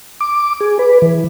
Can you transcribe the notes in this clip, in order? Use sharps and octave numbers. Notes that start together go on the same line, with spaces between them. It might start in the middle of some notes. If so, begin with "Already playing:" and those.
D6
G#4
B4
E3